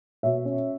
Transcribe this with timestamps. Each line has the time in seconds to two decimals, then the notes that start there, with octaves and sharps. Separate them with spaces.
0.23 B2 C#5 E5
0.45 C#4